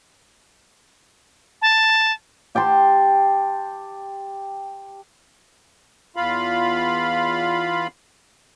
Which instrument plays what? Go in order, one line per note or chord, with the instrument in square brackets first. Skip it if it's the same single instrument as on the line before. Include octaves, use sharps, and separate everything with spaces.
[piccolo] A5
[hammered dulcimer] G4 G5 A5 C6
[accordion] E2 F4 F5 B5